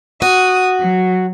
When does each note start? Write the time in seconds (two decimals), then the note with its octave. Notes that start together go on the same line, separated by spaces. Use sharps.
0.22 F#4 D#6
0.80 F#3